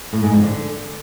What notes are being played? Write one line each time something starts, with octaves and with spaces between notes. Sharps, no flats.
A2
G#2
F2
D3